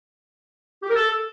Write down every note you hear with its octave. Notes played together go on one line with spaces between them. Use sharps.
G4
A#4
A4